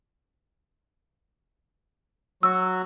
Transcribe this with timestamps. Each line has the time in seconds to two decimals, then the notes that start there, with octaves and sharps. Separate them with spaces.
2.43 F#3 F#4 E6